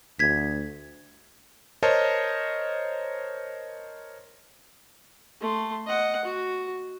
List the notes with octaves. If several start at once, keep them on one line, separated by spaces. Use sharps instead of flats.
D2 G#6 B6
A#4 C5 C#5 D#5 A5
A3 C6
D#5 F#5
F#4